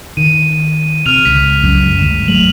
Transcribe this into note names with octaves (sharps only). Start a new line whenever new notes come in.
D#3 D#7
C3 F6 D#7 F7
C#2 B6 F7
F1 C#2 F#2
G#1 D2 G2 E7
F#3 G#3 A3 F7 F#7